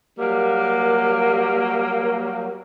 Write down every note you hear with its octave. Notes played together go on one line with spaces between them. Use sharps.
F#3 G3 A#3